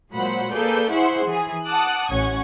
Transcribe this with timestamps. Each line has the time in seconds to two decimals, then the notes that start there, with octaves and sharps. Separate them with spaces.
0.12 A#2 F#3 G#3 C5 F#5 B5
0.54 A#3 G#4 A4 B4 D5 G6
0.91 E4 G#4 C5 F#5 C6 C#6
1.27 E3 G#4
1.67 F#5 A5 D6 D#6 F#6
2.11 A1 C#4 F#5 C#6 G#6